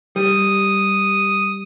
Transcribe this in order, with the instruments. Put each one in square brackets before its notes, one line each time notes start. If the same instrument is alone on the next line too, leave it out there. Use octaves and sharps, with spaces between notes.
[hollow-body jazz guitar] G3 [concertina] D#6